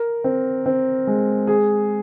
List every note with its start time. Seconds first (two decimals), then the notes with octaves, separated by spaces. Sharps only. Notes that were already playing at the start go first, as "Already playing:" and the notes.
Already playing: A#4
0.24 C4
0.66 C4
1.07 G#3
1.47 G#4